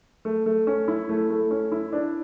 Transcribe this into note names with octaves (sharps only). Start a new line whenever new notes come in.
A3
A3
C#4
E4
A3
A3
C#4
E4
D4